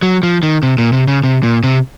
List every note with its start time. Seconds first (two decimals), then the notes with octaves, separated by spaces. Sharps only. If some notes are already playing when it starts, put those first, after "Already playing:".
0.02 F#3
0.23 F3
0.43 D#3
0.63 C3
0.78 A#2
0.93 C3
1.08 C#3
1.24 C3
1.43 A#2
1.63 C3